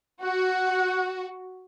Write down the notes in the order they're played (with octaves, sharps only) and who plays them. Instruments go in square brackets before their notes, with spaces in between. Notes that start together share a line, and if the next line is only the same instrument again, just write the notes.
[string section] F#4 [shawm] F#5